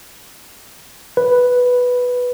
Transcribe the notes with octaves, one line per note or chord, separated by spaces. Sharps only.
B4